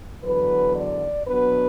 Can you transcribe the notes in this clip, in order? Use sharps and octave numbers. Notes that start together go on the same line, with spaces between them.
E2 D3 F#3 B4
D5
B2 F#3 B3 D4 B4